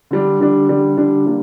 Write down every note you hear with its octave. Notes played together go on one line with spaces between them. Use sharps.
D3 G3 D4
D3 G3 D4
D3 G3 D4
D3 G3 D4
D3 G3 A#3